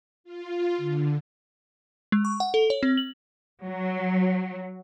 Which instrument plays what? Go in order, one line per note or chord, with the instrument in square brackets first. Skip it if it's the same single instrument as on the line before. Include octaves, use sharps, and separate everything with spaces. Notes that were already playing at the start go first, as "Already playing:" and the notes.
[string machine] F4
D3
[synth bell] G#3
C#6
F#5
A4
C#5
C4
F#7
[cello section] F#3